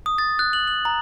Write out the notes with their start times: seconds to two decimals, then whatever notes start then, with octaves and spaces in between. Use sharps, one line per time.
0.06 D#6
0.18 A6
0.39 F#6
0.53 F#7
0.68 F#7
0.85 A#5